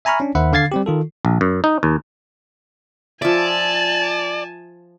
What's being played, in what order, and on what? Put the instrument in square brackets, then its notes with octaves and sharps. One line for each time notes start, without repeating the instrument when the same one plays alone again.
[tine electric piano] E5 G#5 A#5 B5 C#6 F6
C#4 D4
D#2 D#3 C5 E5 F#5 B5
D3 F5 G#6 A6 C7
G3 C4 G4
D#3 F4 A4
[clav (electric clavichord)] A#1
F#2
D#4
D#2
[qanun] F3 E5 [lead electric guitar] D5 [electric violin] G#5 A5